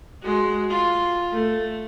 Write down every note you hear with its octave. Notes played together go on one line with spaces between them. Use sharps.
G#3 F#4
F4
A3